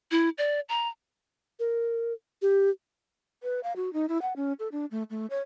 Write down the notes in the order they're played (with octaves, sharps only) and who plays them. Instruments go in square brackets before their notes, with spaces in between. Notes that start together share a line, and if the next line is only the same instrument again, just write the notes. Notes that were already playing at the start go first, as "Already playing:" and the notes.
[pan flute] E4
D5
A#5
[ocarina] A#4
G4
[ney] B4
F5
F#4
D#4
E4
F#5
C#4
A4
D4
A3
A3
C#5